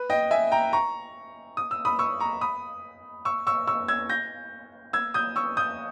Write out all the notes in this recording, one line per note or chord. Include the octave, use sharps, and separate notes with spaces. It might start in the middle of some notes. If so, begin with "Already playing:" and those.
Already playing: B4
D#5 G5
E5 G#5
G5 A#5
A#5 C#6
D#6
E6
B5 D#6
C#6 E6
A#5 C#6
B5 D#6
C#6 E6
C#6 E6
C#6 E6
E6 G#6
G6 A#6
E6 G#6
D#6 G6
C#6 E6
D#6 G6